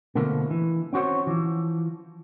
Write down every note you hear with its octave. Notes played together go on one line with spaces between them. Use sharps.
B2 D3 F3 A3 A#3
E3
C4 C#4 F#4 C5 C#5
E3 F3